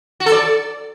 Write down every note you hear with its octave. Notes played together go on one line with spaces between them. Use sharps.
F#4
A4
D5